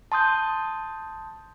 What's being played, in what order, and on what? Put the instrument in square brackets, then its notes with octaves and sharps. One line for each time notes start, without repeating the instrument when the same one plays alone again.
[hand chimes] A5 C6 D#6 G6